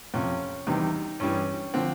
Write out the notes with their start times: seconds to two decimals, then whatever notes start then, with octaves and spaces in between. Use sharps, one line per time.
0.14 F2 C3 F3 C#4
0.67 E2 C3 D#3 G3 D#4
1.20 G2 E3 G3 C#4
1.74 D3 F3 C4